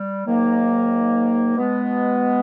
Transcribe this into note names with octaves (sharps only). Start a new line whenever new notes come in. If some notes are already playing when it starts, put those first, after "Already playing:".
Already playing: G3
G#2 D#3 F#3 A#3
B2 G#3 B3